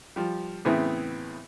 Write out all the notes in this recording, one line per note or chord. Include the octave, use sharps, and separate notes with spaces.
F3 G3
A2 C#3 E3 B3 C4 G#4